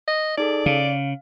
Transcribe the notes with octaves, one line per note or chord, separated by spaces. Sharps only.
D#5
D#4 G#4 A4 D5
C#3 F5